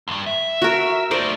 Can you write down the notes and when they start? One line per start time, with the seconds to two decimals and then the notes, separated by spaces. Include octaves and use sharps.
0.08 D2 G2
0.26 E5
0.62 F#4 A#4
1.11 A3 D#4 A#4 C5 D5